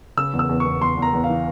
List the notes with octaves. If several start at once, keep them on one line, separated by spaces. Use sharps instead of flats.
C#3 E6
E2
E6
E2
E2 C#6
E2 C6
E2
A#5
E2
F5
E3